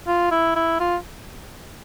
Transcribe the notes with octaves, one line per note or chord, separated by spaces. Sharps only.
F4
E4
E4
F4